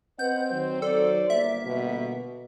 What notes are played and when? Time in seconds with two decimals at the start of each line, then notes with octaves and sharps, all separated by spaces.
0.19 C4 B4 D#5 F#5 G6
0.51 D#3 F#3 C5
0.82 A4 D5
1.30 G1 A#3 E5
1.66 B2